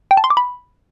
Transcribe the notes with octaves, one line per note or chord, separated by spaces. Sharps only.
G5
A5
C6
D6
B5